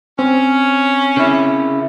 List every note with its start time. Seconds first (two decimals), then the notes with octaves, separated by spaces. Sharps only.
0.19 C4 C#4
1.17 C#3 E4